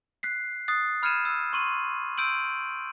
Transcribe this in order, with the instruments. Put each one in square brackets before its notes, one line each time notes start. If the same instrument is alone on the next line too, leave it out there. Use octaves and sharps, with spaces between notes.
[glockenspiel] F#6 B6 C7
D#6 F#6 A6 C7
B5 F6 G#6 C#7 D#7 E7
E6
C6 C#6 D#7 F#7
C6 E6 G6 D7 D#7 F#7